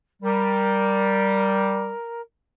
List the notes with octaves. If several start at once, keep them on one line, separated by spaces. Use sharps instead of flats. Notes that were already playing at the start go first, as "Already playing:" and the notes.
G3 A#4